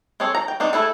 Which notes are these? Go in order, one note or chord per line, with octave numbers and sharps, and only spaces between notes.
C4 G#4 A4 C#5
A#5
G5
C4 D4 D#4
A3 E4 G#4 A4